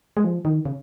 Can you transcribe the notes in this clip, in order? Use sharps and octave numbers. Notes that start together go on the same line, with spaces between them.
G#3
F3
D#3
C#3